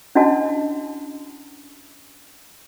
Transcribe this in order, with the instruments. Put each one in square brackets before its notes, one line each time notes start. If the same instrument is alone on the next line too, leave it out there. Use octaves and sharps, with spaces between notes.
[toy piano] C#4 D4 E4 F#4 D#5 A5